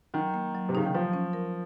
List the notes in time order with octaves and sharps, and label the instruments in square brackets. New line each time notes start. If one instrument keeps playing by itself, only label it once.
[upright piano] D#3 [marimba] F#3
[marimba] A#3
F#3
[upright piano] C3
[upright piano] C#3 [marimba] D#4
[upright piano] D#3
[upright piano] F3 [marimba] F#3
[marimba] C#4
A#4